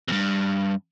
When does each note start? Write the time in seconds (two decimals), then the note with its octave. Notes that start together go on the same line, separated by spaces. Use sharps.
0.08 E2 G2